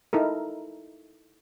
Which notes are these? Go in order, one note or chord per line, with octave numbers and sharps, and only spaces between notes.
D#4 E4 A4 A#4